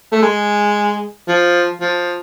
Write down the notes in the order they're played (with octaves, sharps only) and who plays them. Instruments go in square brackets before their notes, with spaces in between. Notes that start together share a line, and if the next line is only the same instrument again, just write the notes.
[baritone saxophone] A3
G#3
F3
F3